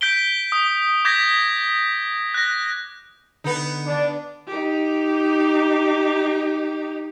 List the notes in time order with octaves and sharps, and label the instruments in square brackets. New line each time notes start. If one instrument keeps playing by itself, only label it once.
[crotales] G6 B6 D7 G7
D#6
D6 G6 G#6 A#6 B6
F#6 A#6
[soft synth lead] D3 [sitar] B3 D#4
[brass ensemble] D4
[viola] D#4 G4